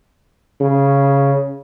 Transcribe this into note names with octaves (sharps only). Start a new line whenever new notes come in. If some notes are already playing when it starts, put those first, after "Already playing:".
C#3